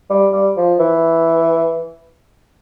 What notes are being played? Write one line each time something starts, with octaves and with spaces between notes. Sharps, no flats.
G3
G3
F3
E3